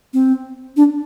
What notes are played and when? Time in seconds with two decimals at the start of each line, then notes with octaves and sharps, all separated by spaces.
0.14 C4
0.77 D4